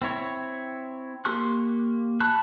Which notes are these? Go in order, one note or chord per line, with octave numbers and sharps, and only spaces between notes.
C4 E4 C#5
A#3 G4 C6 C#6 F#6
A5 B5 C#6 F#6